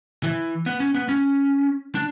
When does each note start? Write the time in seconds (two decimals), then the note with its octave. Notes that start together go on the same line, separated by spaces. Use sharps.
0.23 E3
0.66 B3
0.80 C#4
0.95 B3
1.09 C#4
1.95 D4